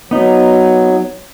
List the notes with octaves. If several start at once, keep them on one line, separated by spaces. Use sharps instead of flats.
F#3 B3 D#4